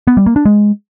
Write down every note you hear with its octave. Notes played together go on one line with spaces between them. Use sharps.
B3
G3
A#3
D4
G#3